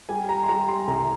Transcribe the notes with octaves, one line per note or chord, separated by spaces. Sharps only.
G3 G#5
A#5
C6
G3 A#5
C6
C2 A#5